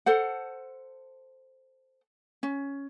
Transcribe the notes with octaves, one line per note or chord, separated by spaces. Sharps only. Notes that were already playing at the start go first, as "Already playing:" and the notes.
A4 C5 F#5
C#4